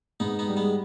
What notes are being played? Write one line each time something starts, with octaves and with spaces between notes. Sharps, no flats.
G#2 B3 D#4
B3 D#4
G3
G#3 B3